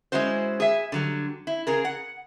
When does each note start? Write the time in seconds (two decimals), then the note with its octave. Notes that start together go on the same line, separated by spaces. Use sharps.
0.12 G#3 C#4 E4 F#4 C5
0.60 G#4 E5
0.92 D3 F#3 G3
1.47 E4
1.67 C#3 G#4 A#4
1.85 F#5